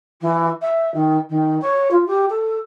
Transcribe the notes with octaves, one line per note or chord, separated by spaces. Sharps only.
E3
E5
D#3
D#3
C#5
F4
G4
A4